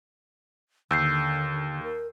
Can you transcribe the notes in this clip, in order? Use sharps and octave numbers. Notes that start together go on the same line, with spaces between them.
D#2 D3 E6 G6 C7
A#4